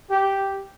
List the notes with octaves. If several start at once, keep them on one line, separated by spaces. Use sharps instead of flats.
G4